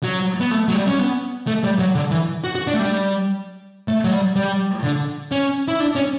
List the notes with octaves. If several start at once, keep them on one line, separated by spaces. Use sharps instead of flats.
F#3
B3
A3
F#3
G3
C#4
B3
A3
G3
F#3
D3
E3
F#4
F#4
D4
A3
G3
A3
F#3
G3
G3
D3
C#4
E4
D4
C#4